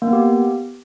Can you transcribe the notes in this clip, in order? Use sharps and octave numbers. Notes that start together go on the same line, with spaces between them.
A#3
B3
G4